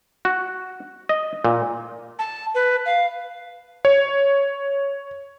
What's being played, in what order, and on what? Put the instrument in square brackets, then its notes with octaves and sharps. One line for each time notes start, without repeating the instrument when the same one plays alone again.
[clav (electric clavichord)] F#4
D#5
A#2
[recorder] A5
B4
F5
[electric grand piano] C#5